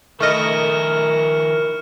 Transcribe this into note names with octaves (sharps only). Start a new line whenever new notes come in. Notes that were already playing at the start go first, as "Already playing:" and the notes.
D#3 A3 E4 A#4 D#5 C#6 F6 C#7